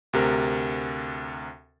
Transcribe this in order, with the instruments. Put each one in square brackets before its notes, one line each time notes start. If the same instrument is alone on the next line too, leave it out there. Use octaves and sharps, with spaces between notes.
[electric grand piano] D2 C3 A#4